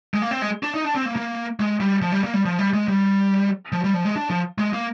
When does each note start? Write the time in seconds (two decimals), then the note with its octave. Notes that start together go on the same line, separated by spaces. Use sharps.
0.14 G#3
0.22 A#3
0.31 C4
0.42 G#3
0.63 D4
0.74 D#4
0.84 D4
0.95 C4
1.06 A#3
1.16 A#3
1.60 G#3
1.80 G3
2.02 F3
2.12 G3
2.24 A#3
2.33 G3
2.45 F3
2.59 G3
2.74 G#3
2.88 G3
3.72 F3
3.84 G3
3.94 F3
4.05 G#3
4.16 D4
4.30 F3
4.58 G#3
4.73 A#3